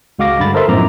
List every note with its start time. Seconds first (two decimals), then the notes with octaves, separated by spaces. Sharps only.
0.19 C#2 G#3 F#4 F5 D6 A#6
0.39 G2 D3 B5 A6
0.54 A4 A#4 C5 D#5 E5 C6
0.68 F#2 A2 F3 B3 A#5 D6